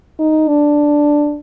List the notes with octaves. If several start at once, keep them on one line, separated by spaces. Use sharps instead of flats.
D#4
D4